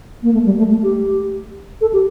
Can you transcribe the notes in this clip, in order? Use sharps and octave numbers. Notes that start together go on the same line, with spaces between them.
A#3
A3
G3
A3
A3
G4
A4
G4